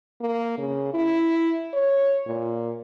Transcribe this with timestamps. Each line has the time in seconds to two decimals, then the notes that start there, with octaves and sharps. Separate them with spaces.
0.21 A#3
0.58 C#3
0.94 E4
1.73 C#5
2.27 A#2